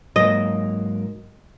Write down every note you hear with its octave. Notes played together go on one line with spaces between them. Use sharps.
G#2 F#3 A#3 D#5